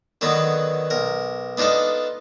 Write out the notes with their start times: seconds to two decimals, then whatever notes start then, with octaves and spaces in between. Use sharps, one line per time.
0.21 D3 D#3 F#3 B3 B4
0.90 B1 A#4
1.57 B3 D4 D#4 F4 A4